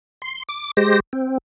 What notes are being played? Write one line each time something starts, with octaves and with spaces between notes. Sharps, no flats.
C6
D6
G#3 G4 C5 A#6
C4